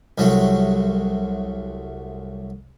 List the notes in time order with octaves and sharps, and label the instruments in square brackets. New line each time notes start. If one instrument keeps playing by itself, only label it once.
[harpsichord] C2 F#3 A3